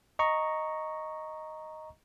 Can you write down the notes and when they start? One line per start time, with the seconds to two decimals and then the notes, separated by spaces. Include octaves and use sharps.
0.19 D#5 A#5 C#6